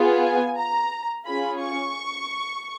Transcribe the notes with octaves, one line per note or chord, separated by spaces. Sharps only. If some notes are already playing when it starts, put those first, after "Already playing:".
Already playing: B3 F4 G#4
G#5
A#5
C#4 F4 G#4 B5
C#6